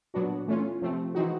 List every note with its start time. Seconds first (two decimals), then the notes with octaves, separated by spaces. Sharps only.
0.14 A#2 F#3 B3 D4 F#4
0.47 E3 A3 C#4 F4
0.82 C3 F3 A3 C4
1.15 E3 G#3 C4 D#4 F#4